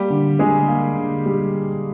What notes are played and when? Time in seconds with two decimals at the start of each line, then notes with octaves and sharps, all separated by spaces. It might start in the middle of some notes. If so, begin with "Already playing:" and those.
Already playing: G3 A#3 G4
0.10 D3
0.39 D3 G#3 G#4
0.68 A#3
0.97 D3
1.26 G3